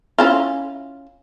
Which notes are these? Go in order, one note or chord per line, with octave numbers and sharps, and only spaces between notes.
C#4 E4 F4